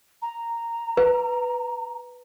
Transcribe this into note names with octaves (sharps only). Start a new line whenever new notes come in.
A#5
B4